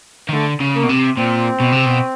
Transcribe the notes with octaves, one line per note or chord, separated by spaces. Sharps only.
D#3
D3 A3
C#3
A#3
B2
C3
A#2 C4
B2
C3
B2